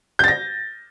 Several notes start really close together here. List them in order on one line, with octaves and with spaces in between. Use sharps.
G6 A6 A#6